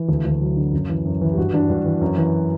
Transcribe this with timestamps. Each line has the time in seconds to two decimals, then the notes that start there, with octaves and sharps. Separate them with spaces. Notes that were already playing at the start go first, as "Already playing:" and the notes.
Already playing: E3
0.09 D2
0.25 D2
0.41 F#3
0.57 D3
0.73 F#2
0.89 E3
1.05 F#2
1.21 E3
1.32 G4
1.37 G2 F#4
1.53 E3 D4
1.69 G2 F#4
1.86 E3
2.01 F#2
2.17 E3